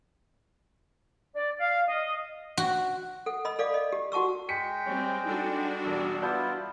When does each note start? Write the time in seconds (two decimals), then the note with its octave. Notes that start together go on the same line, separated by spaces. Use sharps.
1.36 D5
1.59 F5
1.87 D#5
2.57 F#4
3.26 A4 F#5
3.45 D#5 B5 E6
3.59 A4 D5 F5 D6
3.74 D#5
3.93 G4
4.12 F#4 F#5 A5 C#6 E6
4.49 G#3 G5 B6 C#7
4.86 G3 C4 C#5
5.25 G3 D4 D#4 F#4 A4
5.85 E1 A5
6.22 B3 E4 F4 D5 A5 G6